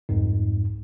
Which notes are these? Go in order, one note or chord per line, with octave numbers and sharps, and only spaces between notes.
C2 F2 G#2